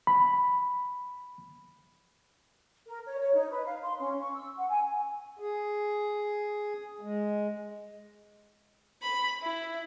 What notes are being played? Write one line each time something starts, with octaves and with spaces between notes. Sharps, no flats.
B5
A#4
C#5
C#5
D#4
B4
F5
C6
C#4
C#6
E6
F#5
G#5
G#4
G#3
B5
E4